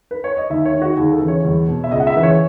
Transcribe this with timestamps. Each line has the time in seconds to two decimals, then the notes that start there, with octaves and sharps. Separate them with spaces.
0.11 B4
0.24 C#5
0.37 D#5
0.50 D#2 E5
0.65 C#5
0.73 D#3
0.82 F#4
0.97 D#2 G#4
1.12 A4
1.21 C#3 E3
1.28 C#5
1.45 E2
1.68 B2
1.84 E5
1.91 C#2 D#5
2.00 F#5
2.07 E5
2.14 C#3 E3
2.23 C#5